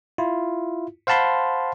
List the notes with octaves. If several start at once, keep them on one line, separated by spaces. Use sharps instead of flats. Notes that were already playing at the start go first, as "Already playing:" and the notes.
E4 F4
C5 F5 F#5 A5 B5 C6